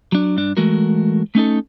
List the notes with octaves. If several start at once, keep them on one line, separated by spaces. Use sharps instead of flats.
F#3 D4
G2 D4
E3 G#3 A3 F#4 A#4
A3 C#4 D#4 A4